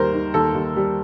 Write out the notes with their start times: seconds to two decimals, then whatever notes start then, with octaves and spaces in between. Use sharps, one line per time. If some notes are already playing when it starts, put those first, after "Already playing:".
Already playing: D#2 G3 A#4 C5
0.13 D#3
0.34 D#2 A4
0.55 D#2
0.76 G3